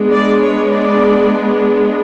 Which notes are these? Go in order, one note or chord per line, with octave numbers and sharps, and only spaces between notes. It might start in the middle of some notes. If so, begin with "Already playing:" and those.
Already playing: G#3 B3 D4
D5
C#5
D5